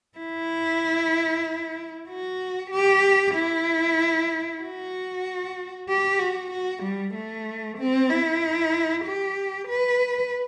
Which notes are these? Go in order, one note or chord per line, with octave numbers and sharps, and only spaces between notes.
E4
F#4
G4
E4
F#4
G4
F#4
F#4
G3
A3
C4
E4
G4
B4